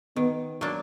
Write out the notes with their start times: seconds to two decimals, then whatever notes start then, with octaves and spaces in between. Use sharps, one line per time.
0.16 D#3 B3
0.61 F#3 A#3 D4